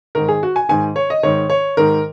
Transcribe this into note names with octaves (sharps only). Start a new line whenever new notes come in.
G#2 D#3 A#4
G#4
F#4
G#5
G#2 D#3 G#5
C#5
D#5
G#2 D#3 C#5
C#5
G#2 D#3 A#4